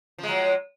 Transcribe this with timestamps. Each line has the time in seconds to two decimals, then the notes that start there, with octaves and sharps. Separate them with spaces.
0.18 F3
0.23 G#3
0.28 F#3